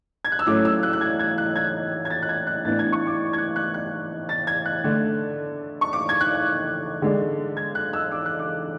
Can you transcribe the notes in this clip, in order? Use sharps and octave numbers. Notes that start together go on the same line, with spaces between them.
G#6
F#6
E6
A2 F#3 A3 C#4 D6
E6
F#6
F#6
G#6
G#6
F#6
G#6
G#6
A6
F#6
G#6
F#6
A2 E3 B3 D4 A6
G#6
C#6
D6
G#6
F#6
F#6
F#6
A6
G#6
F#6
D3 A3 D4
C#6
D6
G#6
F#6
D3 G#3 D4
G#6
F#6
E6
D6
F#6
D6